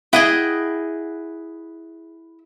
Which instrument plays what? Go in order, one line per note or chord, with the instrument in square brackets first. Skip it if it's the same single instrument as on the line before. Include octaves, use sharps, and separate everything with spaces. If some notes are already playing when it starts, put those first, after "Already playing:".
[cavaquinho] E4 F#5 [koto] G#4 D#5 G5